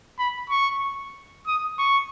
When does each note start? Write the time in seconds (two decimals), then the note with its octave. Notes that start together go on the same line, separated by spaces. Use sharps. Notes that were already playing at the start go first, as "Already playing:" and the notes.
0.19 B5
0.50 C#6
1.47 D#6
1.78 C#6